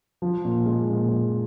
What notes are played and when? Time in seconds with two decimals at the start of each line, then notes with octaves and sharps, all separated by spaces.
0.22 F3
0.45 A#2
0.66 G#3
0.89 A#2
1.11 F3